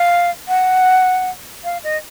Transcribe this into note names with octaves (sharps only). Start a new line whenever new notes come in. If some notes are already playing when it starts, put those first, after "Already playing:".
Already playing: F5
F#5
F5
D#5